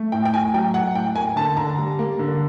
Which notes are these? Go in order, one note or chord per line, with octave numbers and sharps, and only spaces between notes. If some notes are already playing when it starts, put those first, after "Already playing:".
Already playing: A3
A2 G5
G5
A2 G#5
F#3 G5
A3 F#5
A2 G5
A#3 G#5
D3 A5
D3 A#5
G3
A#3
D3